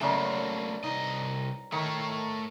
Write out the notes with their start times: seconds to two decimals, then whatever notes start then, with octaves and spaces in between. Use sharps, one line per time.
0.01 F#2 C#3 A3 A#3 B4 C#5 D5 A5
0.36 D5
0.83 C2 D#4 D#5
1.72 D#3 A3 A#4 C#5